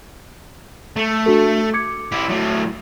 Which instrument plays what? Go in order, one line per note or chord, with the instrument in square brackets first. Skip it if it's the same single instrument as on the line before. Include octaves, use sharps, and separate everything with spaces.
[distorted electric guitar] A3
[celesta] D4 F#4 A4
D6 G#6 C#7
[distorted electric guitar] E4 G4
A2 F#3